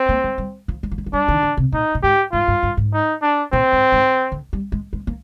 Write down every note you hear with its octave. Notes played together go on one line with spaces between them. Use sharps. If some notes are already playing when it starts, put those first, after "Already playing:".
Already playing: C4
A#3
G#3
G3
F3
G#3
F3
G3
F3
G3 D4
D#3
D3
C3
A#2 D#4
A#2
G#2 G4
G#2 F4
G2
G2
G#2
D#4
D4
A#2 C4
G#2
G#2
D3
G3
G#3
G#3
A#3